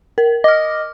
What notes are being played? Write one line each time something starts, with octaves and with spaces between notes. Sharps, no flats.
A#4
D#5 D6 F6